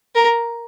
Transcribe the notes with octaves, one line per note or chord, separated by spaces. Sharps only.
A#4